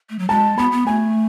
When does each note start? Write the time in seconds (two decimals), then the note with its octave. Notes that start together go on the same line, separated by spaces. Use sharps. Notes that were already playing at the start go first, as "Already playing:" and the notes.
0.10 A3
0.19 F#3
0.29 G#3 A5
0.57 B3 B5
0.72 B3
0.86 A3 G#5